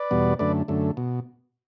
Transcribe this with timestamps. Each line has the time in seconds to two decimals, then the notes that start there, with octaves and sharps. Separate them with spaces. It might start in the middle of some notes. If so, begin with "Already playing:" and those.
Already playing: B4 D5
0.11 E2 B2 G3 B3
0.39 F#2 D3 A3 B4 D5
0.68 F#2 D3 A3
0.97 B2